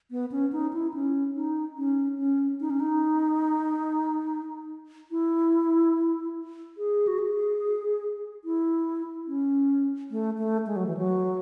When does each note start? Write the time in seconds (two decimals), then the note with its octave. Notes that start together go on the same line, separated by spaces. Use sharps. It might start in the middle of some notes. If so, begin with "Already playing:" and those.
0.11 B3
0.31 C#4
0.52 D#4
0.73 E4
0.94 C#4
1.36 D#4
1.78 C#4
2.19 C#4
2.61 D#4
2.70 C#4
2.80 D#4
5.11 E4
6.78 G#4
7.07 F#4
7.19 G#4
8.44 E4
9.28 C#4
10.11 A3
10.38 A3
10.66 G#3
10.76 F#3
10.87 E3
10.97 F#3